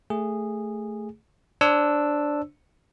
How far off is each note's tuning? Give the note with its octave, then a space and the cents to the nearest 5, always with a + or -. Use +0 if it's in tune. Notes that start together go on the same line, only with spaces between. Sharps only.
A3 +0 G#4 -15
D4 +0 C5 +25 E6 +0